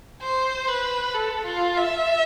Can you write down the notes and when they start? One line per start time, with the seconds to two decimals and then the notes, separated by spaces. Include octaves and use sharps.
0.22 C5
0.68 B4
1.14 A4
1.45 F4
1.77 E5